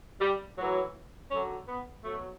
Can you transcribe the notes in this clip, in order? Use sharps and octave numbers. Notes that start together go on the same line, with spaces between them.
G3
A2 E3 F#3
F#2 D3 F#3 C#4
B3
B2 F#3 A3